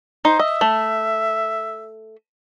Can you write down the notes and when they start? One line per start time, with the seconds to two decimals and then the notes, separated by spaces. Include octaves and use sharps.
0.25 D#4 C5
0.39 D#5 E5
0.61 A3